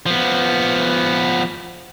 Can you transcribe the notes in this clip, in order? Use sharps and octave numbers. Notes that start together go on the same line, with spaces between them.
F3 B3